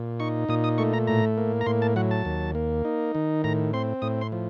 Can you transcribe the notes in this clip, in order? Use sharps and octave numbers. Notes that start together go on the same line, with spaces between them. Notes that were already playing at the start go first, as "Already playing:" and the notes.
Already playing: A#2
D#4 C#6
A#2 D#6
D#6
A3 C#6
A#5
A2 A#5
A#3
A#5
A2 C6
A5
F#3 F#5
A5
D#2
A#3
D#4
D#3
A2 A#5
C4 C6
A2 D#6
C6
F3